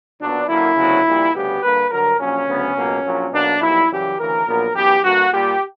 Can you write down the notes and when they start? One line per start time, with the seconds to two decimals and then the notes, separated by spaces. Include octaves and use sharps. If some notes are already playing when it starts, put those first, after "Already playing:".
0.19 B1 A#2 F#3 B3 D4
0.48 F#2 D3 A#3 E4
0.76 D2 C#3 F#3 B3
1.05 A#1 A#2 G3
1.33 D2 C#3 G3 B3 G4
1.62 G2 D3 A#3 B4
1.91 G2 D3 F#3 A#4
2.19 A#1 A#2 F#3 C#4
2.47 D2 C#3 F#3 B3
2.76 C#2 B2 F#3 A#3
3.04 A#1 A#2 F#3
3.32 B1 B2 A#3 D4
3.61 B1 A#2 G3 E4
3.89 F#2 C#3 E3 G3 G4
4.18 D2 C#3 E3 A#4
4.46 A#1 A#2 F#3 B3
4.74 F#2 E3 B3 G4
5.03 G2 D3 A#3 F#4
5.32 A#2 G3 A#3 G4